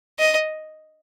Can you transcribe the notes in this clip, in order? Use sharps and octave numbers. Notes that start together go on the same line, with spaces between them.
D#5